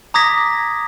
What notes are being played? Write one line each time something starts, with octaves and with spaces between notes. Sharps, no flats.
A#5 D6 D#6 G#6 A#6 B6